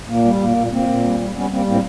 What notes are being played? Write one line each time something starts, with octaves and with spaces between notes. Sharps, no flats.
A#2 A#3
G3
A#2 A#3
A#2
A#2 A#3 C4
A#2
G3
G3
G3 B3 C#4
G3 A#3 C4
A2 A#3 C4